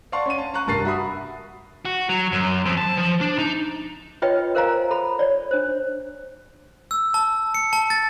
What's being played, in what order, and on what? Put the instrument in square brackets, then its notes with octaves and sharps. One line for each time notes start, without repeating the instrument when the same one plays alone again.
[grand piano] D5 F5 F#5 A5 C6 C#6
C#4 D#7
A5
A5 A#5 C#6 F#6
F1 G2 A#4 A5 A6 C7
F#4 E5 B5 D#6
[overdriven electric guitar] F#4
F#3
F#2
F2
A5
F3
D4
D#4
[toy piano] F4 B4 C#5 D#5 G5
A#4 C5 F5 G#5 A#5
A4 B5
C#5 D5
D4 C5
[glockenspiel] E6
A5
C#7
A5
A6